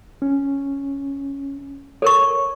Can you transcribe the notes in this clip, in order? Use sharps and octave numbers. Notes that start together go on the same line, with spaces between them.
C#4
A4 A#4 C#5 C#6